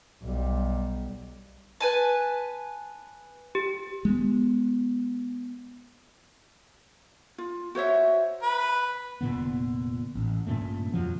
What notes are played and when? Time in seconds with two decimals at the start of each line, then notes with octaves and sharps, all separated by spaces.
0.24 B1 G3
1.80 B4 G#5 A5
3.55 G4
4.05 G#3 B3
7.38 F4
7.75 F#4 C5 C#5 E5
8.43 B4
9.21 F1 A#2 D3 B3
10.15 A1
10.46 G2 A#2 C#3 A3
10.93 F2 C#3 F3 F#3